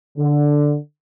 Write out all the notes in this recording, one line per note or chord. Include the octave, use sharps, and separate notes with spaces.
D3